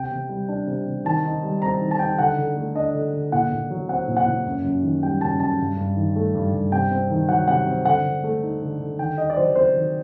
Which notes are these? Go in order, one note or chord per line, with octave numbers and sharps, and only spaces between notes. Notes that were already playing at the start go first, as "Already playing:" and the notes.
Already playing: C3 G5
C3
G3
D4
C3
C3
D#3 A5
D#4
G3
C4 A#5
D#3
A5
D#4 G5
D3 F#5
D3
A3
D4 D#5
D3
D3
A#2 F#5
A#2
F#3
C4 F#5
A#2
F#5
A#2
F#2
F#2
D#3
G3 G5
F#2 A5
F#2 A5
G2
G2
D#3
A3
G2
G2
C3 G5
C4
D#3
F#3 F#5
C3 F#5
C4
D3 F#5
D3
A3
D#4
D3
D3
D#3 G5
D#4 D#5
D5
F#3 C5
C4 C5
D#3